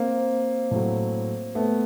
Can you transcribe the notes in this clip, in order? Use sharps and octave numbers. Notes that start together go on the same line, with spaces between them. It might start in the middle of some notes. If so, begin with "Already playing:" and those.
Already playing: A#3 C4
A2 F#3
A3 B3